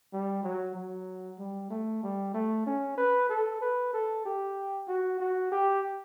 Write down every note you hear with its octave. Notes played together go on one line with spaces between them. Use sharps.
G3
F#3
F#3
G3
A3
G3
A3
C#4
B4
A4
B4
A4
G4
F#4
F#4
G4